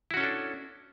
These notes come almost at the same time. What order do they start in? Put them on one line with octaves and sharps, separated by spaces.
E4 F#4 C#4 A4 D4